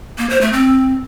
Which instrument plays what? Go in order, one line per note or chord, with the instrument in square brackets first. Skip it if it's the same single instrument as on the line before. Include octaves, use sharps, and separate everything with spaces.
[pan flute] A#3
C5
A3
C4